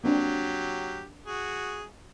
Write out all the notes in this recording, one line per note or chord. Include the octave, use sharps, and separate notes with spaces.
F#3 A#3 C4 D4 G4
F#4 G#4